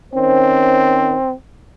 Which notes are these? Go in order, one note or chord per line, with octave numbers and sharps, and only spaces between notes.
D#3 C4 C#4 C5